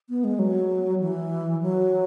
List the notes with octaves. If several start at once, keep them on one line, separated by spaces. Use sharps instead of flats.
B3
G#3
F#3
E3
F#3